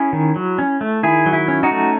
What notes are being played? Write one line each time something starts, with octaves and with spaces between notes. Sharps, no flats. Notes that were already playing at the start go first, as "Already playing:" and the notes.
Already playing: C#4 E4 G#4
D#3
F#3
C#4
A3
D#3 E4 G#4
F#3
E4
C#4
D#4 F#4
A3